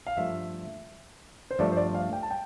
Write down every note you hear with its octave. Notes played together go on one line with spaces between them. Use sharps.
F5
G2 F3 A3 E5
C5
G2 F3 A3 D5
C5
D5
F5
G5
A5
G5